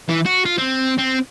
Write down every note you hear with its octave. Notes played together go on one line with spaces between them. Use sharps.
E3
F#4
F4
C4
C4